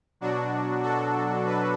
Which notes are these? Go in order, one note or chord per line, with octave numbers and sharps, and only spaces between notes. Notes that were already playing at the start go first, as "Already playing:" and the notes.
B2 F#3 D4 F#4
F#4 A4
B4